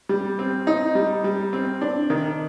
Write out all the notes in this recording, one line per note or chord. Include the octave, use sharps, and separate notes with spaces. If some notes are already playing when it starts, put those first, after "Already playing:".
G3
C4
D#4
G3
G3
C4
D4
D#3